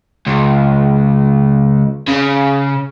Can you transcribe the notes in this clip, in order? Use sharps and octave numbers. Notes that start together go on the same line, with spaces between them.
C#2
C#3